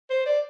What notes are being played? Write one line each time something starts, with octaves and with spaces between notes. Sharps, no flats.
C5
D5